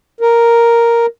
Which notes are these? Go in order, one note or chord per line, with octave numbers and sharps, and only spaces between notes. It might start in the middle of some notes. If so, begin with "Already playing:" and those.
A#4